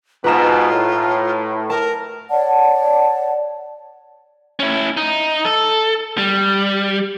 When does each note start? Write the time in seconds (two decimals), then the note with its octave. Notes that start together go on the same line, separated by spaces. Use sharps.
0.24 G#2 B2 F4 B4 A#5 E7
0.70 A2
1.70 A#4 A5
2.30 C#5 D5 F#5 A5
4.60 C#4 E4
4.97 D#4
5.45 A4
6.18 G3